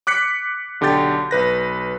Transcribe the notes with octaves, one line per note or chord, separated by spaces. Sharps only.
D6 F#6 B6 C#7
B1 D3 G4 G6 A6
B1 B4 A#6